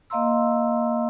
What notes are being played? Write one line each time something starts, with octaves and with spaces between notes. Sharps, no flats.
A#3 D#5 F5 A#5 C6 E6